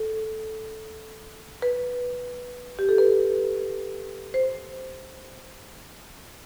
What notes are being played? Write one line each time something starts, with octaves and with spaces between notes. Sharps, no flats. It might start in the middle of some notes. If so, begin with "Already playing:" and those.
Already playing: A4
B4
G4
A4
B4
C5